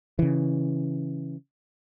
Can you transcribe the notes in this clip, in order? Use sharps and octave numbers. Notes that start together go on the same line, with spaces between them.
C#3 E3